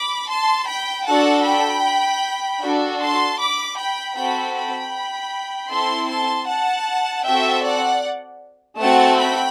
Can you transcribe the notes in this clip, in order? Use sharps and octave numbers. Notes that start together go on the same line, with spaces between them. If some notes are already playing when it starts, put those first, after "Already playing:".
Already playing: B5 D6
A5 C6
G5 B5
D4 F#4 A4 F#5 A5
G5 B5
D4 F#4 A4
A5 C6
B5 D6
G5 B5
C4 F#4 A4 G5 B5
G5 B5
C4 E4 A4 A5 C6
A5 C6
F#5 A5
C4 F#4 A4 E5 G5
D5 F#5
A3 C4 F#4 A4 F#5 A5
G5 B5